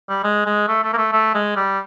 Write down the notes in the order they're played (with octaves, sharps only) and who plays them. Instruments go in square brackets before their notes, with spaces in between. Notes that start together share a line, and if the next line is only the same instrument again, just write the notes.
[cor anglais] G3
G#3
G#3
A3
A3
A#3
A3
A3
G#3
G3